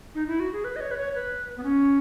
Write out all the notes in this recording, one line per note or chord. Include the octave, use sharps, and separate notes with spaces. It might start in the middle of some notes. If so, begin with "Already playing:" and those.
D#4
E4
F#4
G#4
B4
D#5
C#5
B4
C#5
B4
B3
C#4